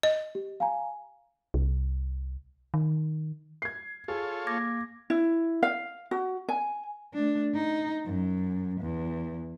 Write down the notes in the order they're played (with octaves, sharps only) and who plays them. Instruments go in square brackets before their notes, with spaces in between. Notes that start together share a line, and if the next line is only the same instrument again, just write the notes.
[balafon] D#5
[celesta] G4
F5 G#5 A#5
[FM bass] C2
D#3
[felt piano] G#6 C7
[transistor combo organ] F4 A4 C#5 [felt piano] G#4
[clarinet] A#3 [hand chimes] D6 G#6 A#6
[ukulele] E4
F5
F#4
G#5
[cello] A3 D4
D#4
F#2
E2